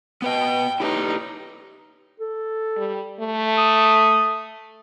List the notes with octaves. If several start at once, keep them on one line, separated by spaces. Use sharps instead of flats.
B3 B4 D#5 G5
D#4 E4 G4 B4
A4
G3
A3
D#6